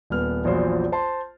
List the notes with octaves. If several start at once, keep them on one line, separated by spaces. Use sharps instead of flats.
D#1 B3 F6
A#1 E2 A#2 F#3 C5
C5 A5 C6